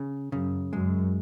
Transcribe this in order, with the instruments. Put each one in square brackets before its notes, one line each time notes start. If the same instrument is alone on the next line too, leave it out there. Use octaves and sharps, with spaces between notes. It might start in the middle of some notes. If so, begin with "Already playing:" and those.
Already playing: [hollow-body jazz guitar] C#3
[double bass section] F#2 [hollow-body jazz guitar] C#3
[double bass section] F#2 [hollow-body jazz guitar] G#3